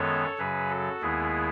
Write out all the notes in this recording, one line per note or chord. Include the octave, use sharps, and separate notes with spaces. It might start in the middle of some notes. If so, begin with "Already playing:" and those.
Already playing: F#2 D#3 G#3 B3 A4 C#5
F#2 C#3 F#3 G#4 B4
F#4 A4
D#2 D#3 G#3 B3 E4 G#4